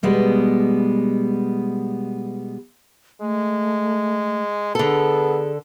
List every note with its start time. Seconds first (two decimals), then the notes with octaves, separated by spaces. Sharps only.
0.03 B2 G3 G#3 B3
3.21 G#3 A3
4.75 D3 B3 G#4 A4